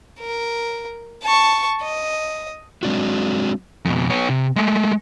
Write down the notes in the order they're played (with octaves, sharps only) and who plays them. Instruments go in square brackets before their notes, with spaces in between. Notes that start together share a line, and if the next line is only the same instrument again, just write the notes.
[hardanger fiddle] A#4
A5 C#6
D#5
[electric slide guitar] F#3 G#3 C4 D4 E4 F#4
[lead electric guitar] F2 B2
B3 C#5
C3
G#3 A3